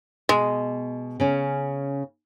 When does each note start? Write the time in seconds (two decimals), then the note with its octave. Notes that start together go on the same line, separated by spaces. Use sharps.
0.29 B2 G#3
1.20 C#3 C#4